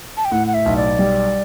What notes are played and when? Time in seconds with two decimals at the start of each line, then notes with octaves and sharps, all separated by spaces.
0.17 A5
0.25 G5
0.32 A2 F#5
0.47 F#5
0.54 E5
0.66 B1
0.76 D5
0.99 G3